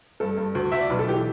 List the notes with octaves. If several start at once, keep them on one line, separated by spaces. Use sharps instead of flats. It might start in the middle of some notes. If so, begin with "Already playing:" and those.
G2 A4
G2
D2
D2 E5
D5
B1 B4
A4
E3 G4